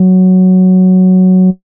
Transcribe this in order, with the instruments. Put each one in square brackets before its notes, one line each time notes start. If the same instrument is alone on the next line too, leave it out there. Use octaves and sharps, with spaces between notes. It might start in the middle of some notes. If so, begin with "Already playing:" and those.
Already playing: [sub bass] F#3